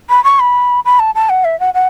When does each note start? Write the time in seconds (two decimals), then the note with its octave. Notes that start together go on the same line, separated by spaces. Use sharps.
0.09 B5
0.24 C#6
0.40 B5
0.85 B5
0.99 A5
1.15 A5
1.29 F#5
1.45 E5
1.60 F#5
1.74 F#5